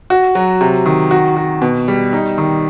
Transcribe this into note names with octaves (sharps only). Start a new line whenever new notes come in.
F#4
F#3
C3
D#3
F#4
F#4
B2
G3
D#4
D#3